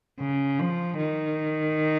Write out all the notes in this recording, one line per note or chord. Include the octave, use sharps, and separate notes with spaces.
C#3
F3
D#3